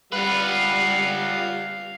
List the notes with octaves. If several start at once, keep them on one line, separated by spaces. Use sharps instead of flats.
G3 F4 B4 F5 F#5